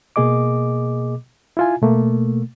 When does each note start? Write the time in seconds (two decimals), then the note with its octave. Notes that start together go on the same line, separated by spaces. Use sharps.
0.16 B2 A#3 G#4 D#5 D6
1.57 E4 F4 G#5
1.81 B2 A3 A#3